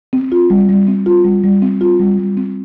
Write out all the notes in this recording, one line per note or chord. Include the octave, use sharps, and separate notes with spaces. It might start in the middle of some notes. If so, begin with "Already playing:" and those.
C4
F4
G3
G3
C4
F4
G3
G3
C4
F4
G3
G3
C4